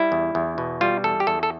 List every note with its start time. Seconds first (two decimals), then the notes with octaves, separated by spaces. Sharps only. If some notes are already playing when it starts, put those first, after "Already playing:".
Already playing: G3 E4
0.12 E2
0.35 E2
0.58 B2
0.81 G3 F4
1.04 E2 A4
1.20 G4
1.27 E2 A4
1.43 A4